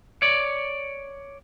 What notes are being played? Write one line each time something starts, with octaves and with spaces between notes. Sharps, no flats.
C#5 D5